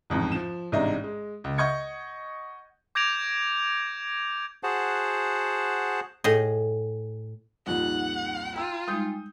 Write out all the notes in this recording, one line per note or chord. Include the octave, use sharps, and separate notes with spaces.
A1 F2 G#2
F3 E7
A1 G#2 C3 D4 D#5
G#3
C#2
D#5 F#5 C#6 G6 G#6 C#7
D6 G6 G#6 A#6 D7 F7
F#4 G#4 C5 F#5 A5
A2 G#4 D#5
C2 F2 A#2 D#4 F#5
F4 G5 A#5 E6
G3 G#3 D#4 D#6 G6